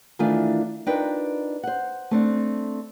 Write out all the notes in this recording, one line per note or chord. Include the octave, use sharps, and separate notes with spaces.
D#3 E3 A3 D4 F4
D4 D#4 F4 A#4 B4 G5
C5 F#5
A3 C4 D4